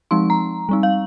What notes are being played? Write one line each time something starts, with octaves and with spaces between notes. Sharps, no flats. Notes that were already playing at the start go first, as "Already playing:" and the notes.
F3 G#3 C4 D#4 C6
A#5
G3 C4 D#4
F5